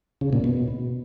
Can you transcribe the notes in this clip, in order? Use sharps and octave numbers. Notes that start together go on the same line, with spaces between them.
C#3
A#2
B2